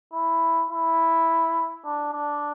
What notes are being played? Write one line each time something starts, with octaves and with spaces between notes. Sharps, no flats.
E4
E4
D4
D4